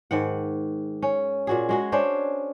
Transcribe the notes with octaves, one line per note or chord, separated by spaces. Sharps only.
G#2 D#3 F#5
C#4
A#2 F#4 G#4
G#3 F#4 G#4
C#4 D4 C5